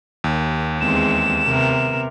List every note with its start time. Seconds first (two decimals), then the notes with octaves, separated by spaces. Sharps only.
0.24 D#2
0.81 E2 G#3 C4 E7
1.46 C3 B3 A#4